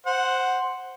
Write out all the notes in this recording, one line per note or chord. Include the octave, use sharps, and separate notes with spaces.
C5 F#5